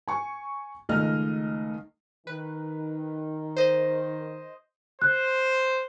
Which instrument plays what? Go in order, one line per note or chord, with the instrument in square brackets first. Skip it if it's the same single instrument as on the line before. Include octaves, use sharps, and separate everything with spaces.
[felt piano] G#5 C#6
C#2 D#3 A3 D#5 F6
[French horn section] D#3 [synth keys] B4
[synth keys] C5 D#5
[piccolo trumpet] C5 [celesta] F#6